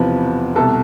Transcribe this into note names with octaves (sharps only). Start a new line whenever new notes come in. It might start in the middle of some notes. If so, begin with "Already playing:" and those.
Already playing: E1 E2 C3 F3 B4
C2 B2 G3 A4